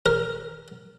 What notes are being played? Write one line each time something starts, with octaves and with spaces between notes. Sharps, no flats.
A#4